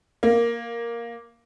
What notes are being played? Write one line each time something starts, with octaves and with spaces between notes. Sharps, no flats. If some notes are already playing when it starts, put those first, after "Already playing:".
A#3